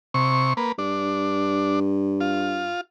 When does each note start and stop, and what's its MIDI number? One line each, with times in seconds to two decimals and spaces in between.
0.14 0.53 48
0.14 0.53 85
0.57 0.72 58
0.57 0.72 71
0.78 2.72 43
0.78 1.79 62
2.21 2.81 65